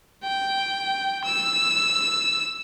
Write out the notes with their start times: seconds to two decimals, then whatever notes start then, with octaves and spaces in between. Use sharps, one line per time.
0.24 G5
1.24 E6